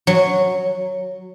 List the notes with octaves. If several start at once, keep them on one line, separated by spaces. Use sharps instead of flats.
F#3